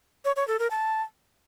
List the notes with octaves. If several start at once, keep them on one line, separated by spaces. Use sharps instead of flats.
C#5
C#5
A4
A#4
A5